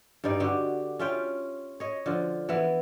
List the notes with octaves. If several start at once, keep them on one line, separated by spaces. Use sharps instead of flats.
G2 G3 D#4 D5
D3 F#4 G4
C#4 F4 E5 G5
C#5 D#5
D3 F3 F4
E3 B3 E4 E5